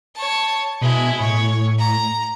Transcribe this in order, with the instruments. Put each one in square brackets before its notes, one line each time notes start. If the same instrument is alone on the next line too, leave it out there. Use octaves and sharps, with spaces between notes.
[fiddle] C#5 A5
[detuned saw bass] B2 [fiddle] G#3 E4
[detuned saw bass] A2 [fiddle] C#5
[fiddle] A#5